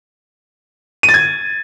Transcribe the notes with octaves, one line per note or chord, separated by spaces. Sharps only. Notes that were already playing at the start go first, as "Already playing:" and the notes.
D#7
A6
G#6